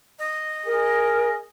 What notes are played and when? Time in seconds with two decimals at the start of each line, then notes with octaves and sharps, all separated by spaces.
0.19 D#5
0.66 G#4 A#4